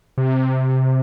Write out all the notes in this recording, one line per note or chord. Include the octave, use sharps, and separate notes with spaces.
C3